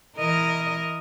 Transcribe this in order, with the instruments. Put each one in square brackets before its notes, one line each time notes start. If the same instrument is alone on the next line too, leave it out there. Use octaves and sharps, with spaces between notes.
[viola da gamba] E3 A#4 D#5